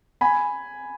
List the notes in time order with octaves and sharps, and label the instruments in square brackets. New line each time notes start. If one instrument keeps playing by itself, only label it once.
[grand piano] G#5 B5